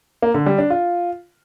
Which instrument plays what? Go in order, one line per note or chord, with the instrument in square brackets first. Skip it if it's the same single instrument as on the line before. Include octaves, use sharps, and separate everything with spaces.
[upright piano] A#3
D3
G3
D4
F4